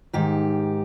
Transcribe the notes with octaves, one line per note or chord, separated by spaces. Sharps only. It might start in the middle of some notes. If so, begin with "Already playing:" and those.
G#2 D#3 G4